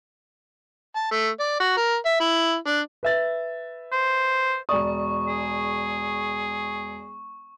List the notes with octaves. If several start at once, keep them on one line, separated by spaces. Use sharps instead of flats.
A5
A3
D5
F#4
A#4
E5
E4
D4
B4 E5 A6
C5
E1 D5 C#6 D#6
G#4